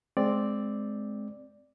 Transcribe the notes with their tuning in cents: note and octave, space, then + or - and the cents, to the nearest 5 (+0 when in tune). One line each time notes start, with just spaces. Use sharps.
G#3 +25 C4 +0 D5 +0